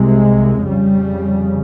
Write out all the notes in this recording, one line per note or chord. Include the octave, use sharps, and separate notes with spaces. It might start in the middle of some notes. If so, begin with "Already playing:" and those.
Already playing: C2 C3 G#3
F2 C#3 G3